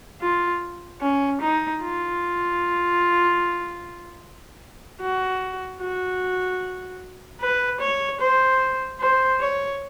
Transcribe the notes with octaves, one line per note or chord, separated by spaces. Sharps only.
F4
C#4
D#4
F4
F#4
F#4
B4
C#5
C5
C5
C#5